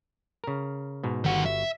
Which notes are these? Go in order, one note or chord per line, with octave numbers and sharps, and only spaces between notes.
C#3 A#4
G#2 B2
G1 D#3 F#4 F#5
E5